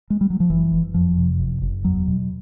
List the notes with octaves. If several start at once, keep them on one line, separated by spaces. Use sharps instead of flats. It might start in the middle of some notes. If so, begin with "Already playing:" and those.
G#3
G3
F#3
F3
F#1 E3
F#1
F2 F3
C3
F#1
F#1
E2 F#3
B2